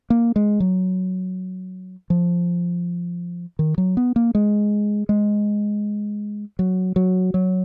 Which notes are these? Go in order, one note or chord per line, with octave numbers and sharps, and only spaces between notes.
A#3
G#3
F#3
F3
D#3
F#3
B3
A#3
G#3
G#3
F#3
F#3
F#3